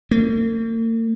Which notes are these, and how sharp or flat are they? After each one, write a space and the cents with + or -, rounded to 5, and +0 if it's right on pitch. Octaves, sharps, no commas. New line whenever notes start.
A#3 -45